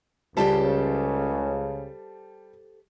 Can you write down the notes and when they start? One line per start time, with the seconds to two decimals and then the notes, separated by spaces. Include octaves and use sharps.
0.37 C#2 C#3 G3 G4 A4 C5 A5